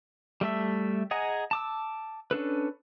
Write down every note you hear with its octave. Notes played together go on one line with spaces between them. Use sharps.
G3 A3 A4 E5
G#4 D#5 F#5 G#5 A#5
A5 D6 E6
C#4 D4 A4 B4